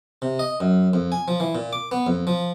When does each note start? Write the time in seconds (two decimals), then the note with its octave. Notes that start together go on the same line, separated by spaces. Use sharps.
0.22 C3
0.39 D#5
0.60 F#2
0.94 F2
1.12 G#5
1.28 F3
1.40 E3
1.55 A#2
1.73 D6
1.91 B3
2.07 F2
2.27 F3